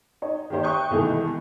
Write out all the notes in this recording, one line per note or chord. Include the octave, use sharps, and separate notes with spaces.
D#4 C#5
D#3 A#3 G4 C5 C#5
E5 G5 C#6 D#6 F#6 G6
C2 B2 D#3 E3 G#3 A3